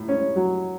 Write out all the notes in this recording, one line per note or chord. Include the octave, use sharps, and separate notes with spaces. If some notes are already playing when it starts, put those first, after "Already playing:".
Already playing: A2
C#4
F#3